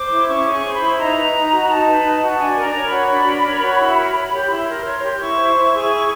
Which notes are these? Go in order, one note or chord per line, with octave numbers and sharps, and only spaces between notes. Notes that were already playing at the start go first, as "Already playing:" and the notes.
Already playing: C5 D6
E4
C#4 C#6
G#4
C#6
C5
B5
E4
D#4 A#5
B4
D#4
F#4
D#4 A5
B4
D#4
F#4
A5
D4 G#5
A#4
A#5
C#5
B5
F#4
D4
A#4
C#5
F#4
E4
A#4
C#5
G4
E4 C6
A#4
C#5
G4
E4 C#6
C5
E4
G#4
E4